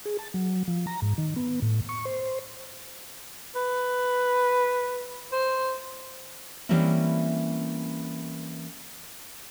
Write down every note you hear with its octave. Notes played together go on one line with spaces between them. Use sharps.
G#4
A5
F#3
F3
A#5
G#2
D#3
B3
A2
C#6
C5
B4
C5
E3 G3 A#3 C4 C#4 E4